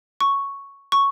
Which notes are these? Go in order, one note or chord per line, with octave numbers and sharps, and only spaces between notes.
C#6
C#6